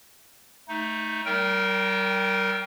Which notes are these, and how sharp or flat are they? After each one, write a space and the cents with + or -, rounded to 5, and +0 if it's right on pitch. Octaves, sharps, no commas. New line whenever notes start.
A3 +0 D#4 +15
G3 -40 A#4 -5 G5 +0